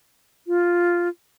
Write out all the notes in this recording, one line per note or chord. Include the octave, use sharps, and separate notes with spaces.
F4